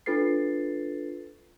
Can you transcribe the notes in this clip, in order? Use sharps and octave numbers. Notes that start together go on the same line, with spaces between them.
D4 F4 A4 B4 A6 C7